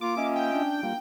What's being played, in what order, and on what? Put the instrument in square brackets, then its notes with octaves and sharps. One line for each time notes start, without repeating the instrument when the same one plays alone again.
[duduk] A#3 [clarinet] F4 [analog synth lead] D6
[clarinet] C#4 [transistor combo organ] F4 D#5 E5
[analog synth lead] G5
[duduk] D4
[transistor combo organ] G3 F4 [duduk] A#3